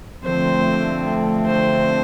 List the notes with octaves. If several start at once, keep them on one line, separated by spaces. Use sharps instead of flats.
D3 F3 A3 C4 C5
C5